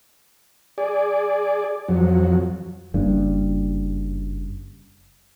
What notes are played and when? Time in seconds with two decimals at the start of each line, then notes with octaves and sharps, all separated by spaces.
0.78 G#4 D5
1.88 F2 F#3
2.94 F#1 G2